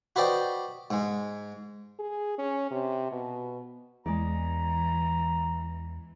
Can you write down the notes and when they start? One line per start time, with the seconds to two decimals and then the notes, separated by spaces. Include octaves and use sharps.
0.16 F#4 B4 C5 D5 D#5 G5
0.91 G#2 G#3
1.99 G#4
2.38 C#4
2.71 C3
3.12 B2
4.06 E2 E3 G#3 D5 A#5